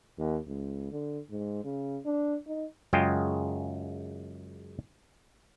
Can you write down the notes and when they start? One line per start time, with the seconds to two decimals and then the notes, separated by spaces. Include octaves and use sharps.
0.18 D#2
0.47 C#2
0.92 D3
1.31 G#2
1.65 C#3
2.05 D4
2.47 D#4
2.93 F#2 C#3 G#3 F4 G5